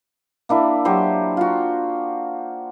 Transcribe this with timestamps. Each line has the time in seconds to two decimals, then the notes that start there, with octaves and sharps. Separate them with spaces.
0.49 A#3 D4 E4
0.85 F#3 G4 C5
1.37 F4 F#4